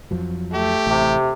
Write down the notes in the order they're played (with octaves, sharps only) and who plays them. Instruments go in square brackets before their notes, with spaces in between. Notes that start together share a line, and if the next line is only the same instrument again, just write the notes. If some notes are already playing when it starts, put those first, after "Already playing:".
[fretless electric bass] F2 F3 F#3
[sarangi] A3 [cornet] G4
[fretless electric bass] A1 A2 [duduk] C3